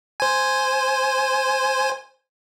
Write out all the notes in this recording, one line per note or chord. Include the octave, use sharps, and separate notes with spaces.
C5 G#5